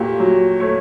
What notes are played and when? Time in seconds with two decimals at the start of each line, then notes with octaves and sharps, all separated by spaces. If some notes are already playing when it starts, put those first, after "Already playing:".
Already playing: A#2 A3 G4
0.20 F#3
0.60 A3 C#5